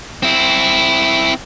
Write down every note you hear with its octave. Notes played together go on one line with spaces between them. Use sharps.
C4 E4